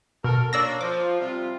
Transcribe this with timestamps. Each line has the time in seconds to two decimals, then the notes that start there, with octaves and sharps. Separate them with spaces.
0.24 B2 A4 A#4
0.53 A#3 C#4 D4 D5 E6 A#6
0.81 F3 D6
1.20 C3 G3 F4